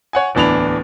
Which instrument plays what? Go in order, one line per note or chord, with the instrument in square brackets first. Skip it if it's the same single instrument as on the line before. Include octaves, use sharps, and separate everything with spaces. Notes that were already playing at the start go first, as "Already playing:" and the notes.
[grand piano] C#5 F#5 G#5
D1 E2 E3 D4 B5 F7